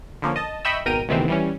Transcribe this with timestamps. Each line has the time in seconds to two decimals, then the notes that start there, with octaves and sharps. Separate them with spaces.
0.22 D3 F3 A#3 C#4
0.36 D#5 A5
0.65 D#5 E5 G5 B5 C#6 E6
0.86 G#1 B2 A#4 G5 A#5 D#7
1.08 D2 C3 D#3 E3 B3 C4
1.28 E3 G3 C#4